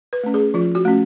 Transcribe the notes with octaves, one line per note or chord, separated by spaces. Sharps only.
B4
A3 C#4
G#4
F3 F4
F#4
A3 C#4